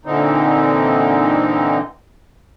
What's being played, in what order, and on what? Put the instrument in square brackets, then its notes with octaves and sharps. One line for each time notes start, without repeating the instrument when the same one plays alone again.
[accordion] A#2 D3 E3 C4 D#4